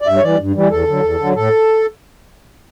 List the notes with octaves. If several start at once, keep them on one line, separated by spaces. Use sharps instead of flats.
D5
G2 E5
C#5
E3 G3 D5
G2
E3 G3
E2 A4
D3 F#3
E2
D3 F#3
A2 A4